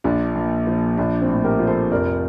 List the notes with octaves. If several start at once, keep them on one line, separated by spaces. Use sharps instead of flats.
A#1 D4 F4
A#2
F3
A#1 D4
C4
A2
G4 A#4
F3
A4 C5
F1 A#4 D5